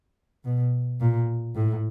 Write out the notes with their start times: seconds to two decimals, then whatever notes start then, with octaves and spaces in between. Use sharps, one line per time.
0.45 B2
1.01 A#2
1.55 A2